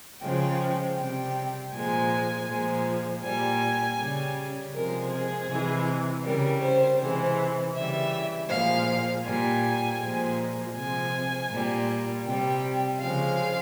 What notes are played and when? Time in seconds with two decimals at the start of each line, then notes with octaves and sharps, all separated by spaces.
0.23 C#3 F3 G#3 G5
0.98 C3 G3 G5
1.74 A#2 F3 G#3 G#5
2.49 A#2 F3 G#3
3.24 A#2 G3 G#5
3.99 C#3 G3
4.74 C3 F3 G#3 A#4
5.11 G#4
5.49 C3 E3 G#3
6.24 C#3 G3 A#4
6.62 C5
6.99 C3 E3 G#3 C5
7.75 C#3 E3 G3 E5
8.50 A#2 F3 G#3 F5
9.25 A#2 G3 G#5
10.00 A#2 F3 G#3
10.75 C3 F3 G#3 G#5
11.51 A#2 G3
12.25 C3 G3 G5
13.01 C#3 F3 G#3 F5